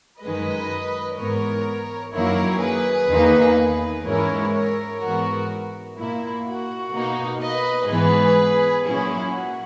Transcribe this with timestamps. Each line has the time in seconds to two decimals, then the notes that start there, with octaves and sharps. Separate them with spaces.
0.21 F#2 D#3 G#3 B4 D#5
1.18 G#2 E3 B3 A#4 C#5
2.13 F#2 D#3 F#3 A#3 E4 A#4 C#5
2.61 G#4 B4
3.09 E2 D#3 A#3 D#4
4.05 G#2 E3 G#3 C#4 E4 A#4 C#5
4.54 A#4 C#5
5.01 G#2 E3 B3 F#4 A#4
5.97 A#2 A#3 E4
6.45 F#4
6.93 B2 A#3 D#4
7.40 B4 D#5
7.88 G#2 E3 B3 G#4 B4
8.85 A#2 F#3 C#4 E4 G#4
9.33 F#4